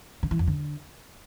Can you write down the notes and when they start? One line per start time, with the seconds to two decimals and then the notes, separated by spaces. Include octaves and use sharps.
0.23 D3
0.31 E3
0.39 F2
0.47 D3